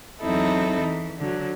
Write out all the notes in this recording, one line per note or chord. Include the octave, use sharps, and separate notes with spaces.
E2 F#3 C4 D#4 E4 A4
E3
D3 F#3